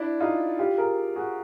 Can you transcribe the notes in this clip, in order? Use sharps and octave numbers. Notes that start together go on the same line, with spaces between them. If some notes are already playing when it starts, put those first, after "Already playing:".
Already playing: D4 E4
D#4 F4
F4 G4
G#4 A#4
F#4 G#4